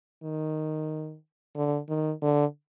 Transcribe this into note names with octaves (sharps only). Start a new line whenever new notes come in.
D#3
D3
D#3
D3